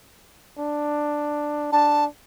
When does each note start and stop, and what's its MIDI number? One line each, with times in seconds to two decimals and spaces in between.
0.58 1.71 62
1.72 2.07 62
1.72 2.05 81